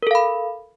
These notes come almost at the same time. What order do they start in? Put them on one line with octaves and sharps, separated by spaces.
A#4 A4 F5 B5